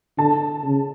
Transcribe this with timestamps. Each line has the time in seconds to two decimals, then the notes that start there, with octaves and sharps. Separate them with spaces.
0.18 D3 A5
0.64 C#3